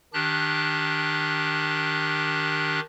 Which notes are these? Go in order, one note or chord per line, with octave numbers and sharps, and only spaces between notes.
D#3 D4 G4 F#6